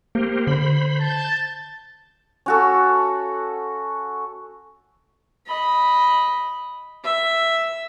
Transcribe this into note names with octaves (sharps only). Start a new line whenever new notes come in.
A#3 G4 A#4 C5
D3 C5 B5
A5 G6
C#4 F#4 A4
D#5 B5
E5